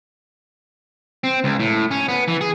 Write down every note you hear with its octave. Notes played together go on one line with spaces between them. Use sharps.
C4
C#2
A2
C#4
B3
E3
G#4